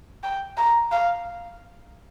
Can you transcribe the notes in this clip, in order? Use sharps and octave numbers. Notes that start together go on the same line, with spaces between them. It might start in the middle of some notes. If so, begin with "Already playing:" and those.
G5
A#5
F5